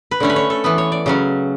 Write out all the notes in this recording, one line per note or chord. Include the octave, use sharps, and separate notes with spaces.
B4
D3 A3 C#4 C#5
B4
C#5
A4
E3 B3 B4
C#5
D5
C#3 F#3 C#4